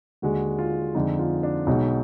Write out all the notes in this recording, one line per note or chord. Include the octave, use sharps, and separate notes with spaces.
D#2 D3 G#3 F#4
F4
F2 D3 G#3 D#4
F4
D4
B1 B2 G#3 D#4